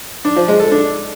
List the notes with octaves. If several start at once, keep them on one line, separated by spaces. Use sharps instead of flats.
D4
F3
G#3
A4
D4